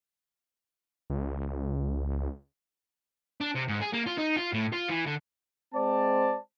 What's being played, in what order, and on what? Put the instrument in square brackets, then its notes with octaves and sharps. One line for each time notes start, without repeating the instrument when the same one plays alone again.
[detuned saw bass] C#2
[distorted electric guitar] D4
C3
G#2
G#4
A#3
F4
D#4
F4
A2
F4
E3
D3
[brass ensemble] G#3 C4 C5 D5 A5